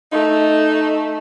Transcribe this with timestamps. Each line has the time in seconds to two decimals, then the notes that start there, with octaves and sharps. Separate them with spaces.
0.12 A3 D#4